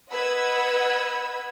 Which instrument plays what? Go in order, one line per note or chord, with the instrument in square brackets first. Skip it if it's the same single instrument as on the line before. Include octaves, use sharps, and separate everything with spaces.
[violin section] B4 D#5 F#5 B5 E6 G#6